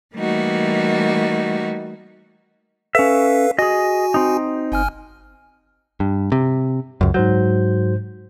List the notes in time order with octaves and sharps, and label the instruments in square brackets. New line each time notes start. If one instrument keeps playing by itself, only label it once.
[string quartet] E3 G3 A3 A#3 D#4 F#4
[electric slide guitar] C#4 E5 [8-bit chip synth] A4 B4 F5
[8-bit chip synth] F#4 G#5 [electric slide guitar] G#4 D#5
[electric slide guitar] C4 D#4
[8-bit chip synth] G1 G#5 F6
[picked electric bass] G2
C3
C#2 F#2
[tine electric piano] G#2 C5 G6 [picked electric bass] F#3